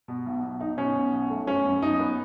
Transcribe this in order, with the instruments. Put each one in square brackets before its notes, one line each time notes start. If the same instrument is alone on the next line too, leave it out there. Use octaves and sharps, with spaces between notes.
[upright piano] B2
B1
B1
D#4
[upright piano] B2 [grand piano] C#4
[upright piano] B1
B1
A3
[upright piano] F#2 [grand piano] C#4
[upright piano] F#2
[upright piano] B3 [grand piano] D#4
[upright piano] B3